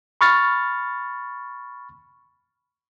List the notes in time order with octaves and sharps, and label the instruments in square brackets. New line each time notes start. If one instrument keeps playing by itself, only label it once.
[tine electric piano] B5 C#6 F6 A6